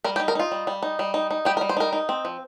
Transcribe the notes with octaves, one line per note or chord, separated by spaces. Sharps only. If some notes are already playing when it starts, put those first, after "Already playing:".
G3 A#4
G4
D#4
A#4
D#4 F4
G3
G3
D#4
G3
D#4
D#4
G3 G4
A#4
G3
C5
D#4 A#4
D#4
C4
F3